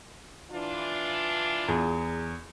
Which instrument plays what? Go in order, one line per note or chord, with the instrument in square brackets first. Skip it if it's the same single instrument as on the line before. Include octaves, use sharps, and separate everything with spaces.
[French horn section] E3 D4 F4
[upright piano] E2 G#4